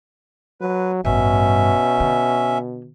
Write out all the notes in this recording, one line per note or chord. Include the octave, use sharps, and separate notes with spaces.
F#3 B4
A1 G2 B2 C#4 E5
D3